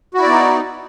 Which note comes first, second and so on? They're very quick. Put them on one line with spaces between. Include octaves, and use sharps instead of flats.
F#4 E4 D5 B3 D#4